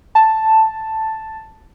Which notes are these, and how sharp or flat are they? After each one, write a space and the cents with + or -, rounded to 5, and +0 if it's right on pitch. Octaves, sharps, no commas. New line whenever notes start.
A5 +0